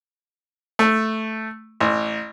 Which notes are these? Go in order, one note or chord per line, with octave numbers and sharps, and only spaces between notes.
A3
A1